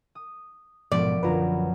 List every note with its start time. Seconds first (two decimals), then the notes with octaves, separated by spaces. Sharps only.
0.15 D#6
0.92 A#1 G#2 B2 F3 B3 D5
1.23 F#2 D3 F4 B4 A#5